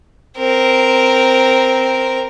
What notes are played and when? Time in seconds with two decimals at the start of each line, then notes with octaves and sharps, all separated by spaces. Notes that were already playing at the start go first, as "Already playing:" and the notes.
0.37 C4 A#4